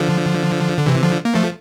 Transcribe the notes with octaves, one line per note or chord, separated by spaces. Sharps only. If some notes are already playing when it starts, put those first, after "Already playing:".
Already playing: D3 F3
D3
C3 E3
D3 F3
A#3
F3 A3